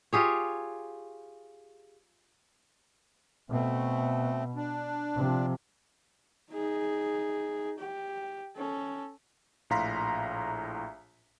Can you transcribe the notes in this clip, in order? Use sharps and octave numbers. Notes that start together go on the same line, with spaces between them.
F4 G4 G#4 C#5
B2 A3 C4
D4
C3 F3
D#4 G#4
G4
C#4 A4
A#1 A2 F5 A#5 C6 B6